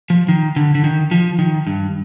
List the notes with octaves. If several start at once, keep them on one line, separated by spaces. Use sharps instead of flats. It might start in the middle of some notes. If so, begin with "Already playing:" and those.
F3
D#3
D3
D3
D#3
F3
D#3
G2